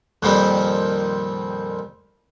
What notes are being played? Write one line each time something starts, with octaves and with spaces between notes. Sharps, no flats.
F2 A#2 D#3 F3 G3 C4